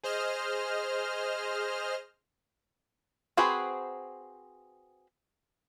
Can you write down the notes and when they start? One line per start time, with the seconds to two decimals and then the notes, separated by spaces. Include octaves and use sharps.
0.03 G#4 C5 D#5 F6
3.37 C4 F#4 G#4 B4 C5